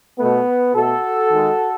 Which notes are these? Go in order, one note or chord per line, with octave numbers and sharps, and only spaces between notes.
B2 A3 B3
B2 A3 F#4 A4
D#3 G#3